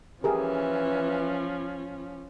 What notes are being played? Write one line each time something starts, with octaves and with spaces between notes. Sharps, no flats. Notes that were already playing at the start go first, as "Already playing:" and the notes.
E3 F3 C#4 G4 G#4 A#4